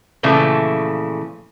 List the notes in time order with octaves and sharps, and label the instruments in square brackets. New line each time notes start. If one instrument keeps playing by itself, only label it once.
[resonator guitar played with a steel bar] A#2 C#3 E3 F3 A3